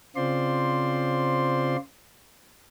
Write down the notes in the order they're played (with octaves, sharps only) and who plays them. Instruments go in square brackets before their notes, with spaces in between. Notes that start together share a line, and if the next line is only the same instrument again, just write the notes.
[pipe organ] C#3 C4 F4 C5 D5 C6